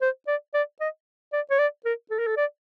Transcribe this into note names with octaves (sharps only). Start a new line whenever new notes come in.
C5
D5
D5
D#5
D5
C#5
D5
A#4
A4
A#4
A4
D5